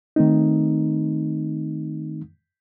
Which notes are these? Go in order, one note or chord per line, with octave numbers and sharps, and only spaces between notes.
D#3 A3 C4 D#4